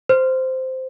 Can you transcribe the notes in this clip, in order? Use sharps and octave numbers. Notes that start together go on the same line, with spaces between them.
C5